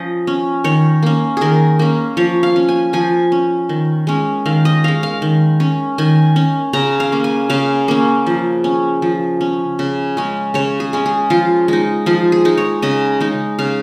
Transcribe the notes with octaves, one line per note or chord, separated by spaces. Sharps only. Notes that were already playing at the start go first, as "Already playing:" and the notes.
Already playing: F3 C#4 D#5
C#4
D#3 C#5
A#3 C#4
D#3 G#4 A#4
A#3 C#4
F3 C#5
F5
C#4
G#5
F3 G#5
C#4
D#3
G#3 C#4
D#3 F5
D#5
G#3 C#4 F5
F5
D#3
C#4
D#3 G#5
C#4
C#3 A#5
F5
A#3 C#4
G#5
C#3 F5
A#3 C#4
F3
C#4
F3
C#4
C#3
G#3 C#4
C#3 C#5
G#4
G#3 C#4
G#4
F3 F4
G#3 D#4
F3 F4
G#4
G#3 D#4
C#5
C#3 D#5
G#3 D#4
C#3 F5